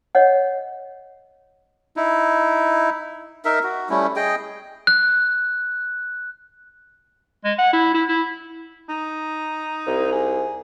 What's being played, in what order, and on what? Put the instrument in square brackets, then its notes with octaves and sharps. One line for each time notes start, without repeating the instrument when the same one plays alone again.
[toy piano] C#5 D#5 F#5
[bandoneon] D#4 E4
[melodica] D#4 A#4 E5
F#4
G3 A3 C#4 E4
G#4 D#5 G5
[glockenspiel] F#6
[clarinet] G#3
F#5
E4
E4
E4
[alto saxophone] D#4
[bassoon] C2
[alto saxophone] G#4